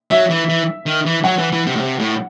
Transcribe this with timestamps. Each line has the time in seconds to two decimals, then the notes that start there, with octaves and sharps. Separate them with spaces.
0.11 F#3 E5
0.30 E3
0.49 E3
0.86 D#3
1.06 E3
1.24 F#3 F#5
1.38 E3
1.53 E3
1.67 C3
1.76 A2
1.81 C3
2.00 A2